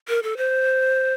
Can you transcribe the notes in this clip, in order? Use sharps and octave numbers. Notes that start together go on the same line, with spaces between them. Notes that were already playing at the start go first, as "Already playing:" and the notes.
A#4
A4
C5